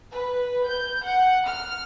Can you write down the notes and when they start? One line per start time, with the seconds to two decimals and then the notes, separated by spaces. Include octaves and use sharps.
0.11 B4
0.65 G6
1.04 F#5
1.45 F6